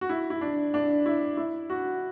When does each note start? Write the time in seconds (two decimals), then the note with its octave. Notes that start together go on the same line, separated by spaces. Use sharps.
0.01 F#4
0.09 E4
0.30 E4
0.41 D4
0.74 D4
1.06 E4
1.37 E4
1.70 F#4